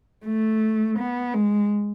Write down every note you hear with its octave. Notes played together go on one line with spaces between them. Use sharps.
A3
B3
G#3